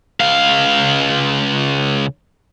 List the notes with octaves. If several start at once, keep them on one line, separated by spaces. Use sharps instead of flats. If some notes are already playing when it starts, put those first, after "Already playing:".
C#2 F5